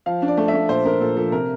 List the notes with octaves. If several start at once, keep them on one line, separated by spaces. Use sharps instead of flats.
F3 F5
D4
D5
A3
E5
A3
A#2 C5
D4 A#4
A#2 A4
F3 A4
C3 A#4